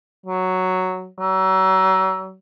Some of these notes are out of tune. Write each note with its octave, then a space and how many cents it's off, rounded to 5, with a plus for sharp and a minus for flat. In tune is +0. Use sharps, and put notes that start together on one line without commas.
F#3 +0
F#3 +35